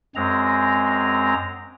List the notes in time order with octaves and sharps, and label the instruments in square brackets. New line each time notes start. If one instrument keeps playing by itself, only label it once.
[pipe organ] F#2 G#3 C4 A#5